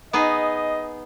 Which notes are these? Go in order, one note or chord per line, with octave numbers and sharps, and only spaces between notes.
B3 D#4 G#4 D#5